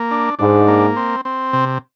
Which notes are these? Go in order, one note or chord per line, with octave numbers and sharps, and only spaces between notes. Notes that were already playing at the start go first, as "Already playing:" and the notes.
Already playing: A#3
D4
G#2 D4
A#3
C4
C4
C3